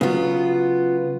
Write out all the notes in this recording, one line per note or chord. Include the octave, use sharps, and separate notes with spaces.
C#3 F#3 B3 F4